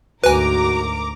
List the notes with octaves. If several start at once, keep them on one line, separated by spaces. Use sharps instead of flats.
D2 G#2 F#4 A#4 B4 G#5 A#5 D6